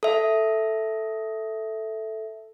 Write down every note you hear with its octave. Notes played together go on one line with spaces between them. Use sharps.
A4 E5